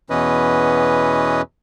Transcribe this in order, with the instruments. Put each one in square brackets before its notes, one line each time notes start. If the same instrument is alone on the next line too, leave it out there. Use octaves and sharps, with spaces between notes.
[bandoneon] E2 B2 E3 C#4 B4 D#5